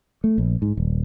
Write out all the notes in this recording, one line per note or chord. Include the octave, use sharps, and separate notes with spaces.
A3
A#1
G#2
D#1